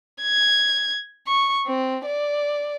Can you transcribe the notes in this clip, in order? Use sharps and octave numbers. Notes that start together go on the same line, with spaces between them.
G#6
C#6
C4
D5